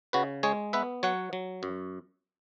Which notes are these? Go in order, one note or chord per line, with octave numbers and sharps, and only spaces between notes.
C#3 F#4 B4
G#3 G#4 C#5
B3 B4 E5
F#3 C#5 F#5
F#3
F#2